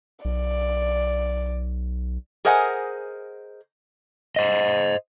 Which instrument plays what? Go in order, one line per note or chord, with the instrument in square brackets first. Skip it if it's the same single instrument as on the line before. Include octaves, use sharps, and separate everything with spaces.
[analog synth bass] B1 [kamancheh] D5
[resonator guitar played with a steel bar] G#4 A#4 C5 D#5 F#5 G#5
[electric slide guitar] C5 D#5